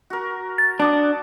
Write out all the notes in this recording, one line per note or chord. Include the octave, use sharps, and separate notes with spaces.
F#4 A#4
A6
D4 F#5 D6 D#6